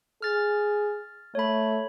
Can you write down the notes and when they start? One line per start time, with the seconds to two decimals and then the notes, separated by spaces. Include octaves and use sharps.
0.22 G#4 F6 A6
1.35 A3 C#5 B5